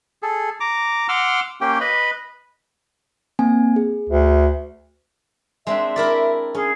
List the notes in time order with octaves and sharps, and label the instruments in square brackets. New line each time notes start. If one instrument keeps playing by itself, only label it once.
[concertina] G#4 A4
A#5 D6
F#5 C6 D6 E6 F6
A#3 C#4 G4 G5
B4 D#5 B5
[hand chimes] A#3 C4 G#5
G#4
[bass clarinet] D2
[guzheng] G#3 C4 D4 [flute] E5
[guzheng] E4 A#4 D5
[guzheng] C#4 [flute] G#4